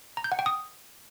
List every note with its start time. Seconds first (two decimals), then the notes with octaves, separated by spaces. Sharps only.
0.17 A#5
0.24 G6
0.32 F#5
0.39 G5
0.46 D#6